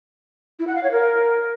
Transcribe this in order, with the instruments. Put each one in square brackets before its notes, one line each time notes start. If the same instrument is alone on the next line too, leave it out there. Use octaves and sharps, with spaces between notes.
[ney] E4
F#5
F5
C#5
A#4